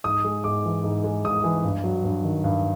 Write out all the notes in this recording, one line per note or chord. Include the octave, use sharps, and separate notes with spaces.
G#2 D#6
G#3
G#2 D6
E3
G#2
G#3
G#2 D#6
E3
G2
F#3
G2
D#3
G2